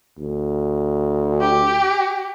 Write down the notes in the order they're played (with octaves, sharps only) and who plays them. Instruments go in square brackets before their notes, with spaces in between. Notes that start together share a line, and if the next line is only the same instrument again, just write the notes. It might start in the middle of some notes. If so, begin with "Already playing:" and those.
[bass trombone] D2
[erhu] G4